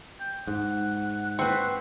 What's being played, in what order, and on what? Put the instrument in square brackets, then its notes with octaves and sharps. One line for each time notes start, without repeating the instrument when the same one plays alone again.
[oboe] G5
[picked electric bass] G#2 [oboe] F#5
[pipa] C4 [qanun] B4 C#6